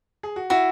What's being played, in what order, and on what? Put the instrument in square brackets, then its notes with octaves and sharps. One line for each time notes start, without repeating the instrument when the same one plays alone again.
[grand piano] G#4
F#4
[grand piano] E4 [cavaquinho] F#4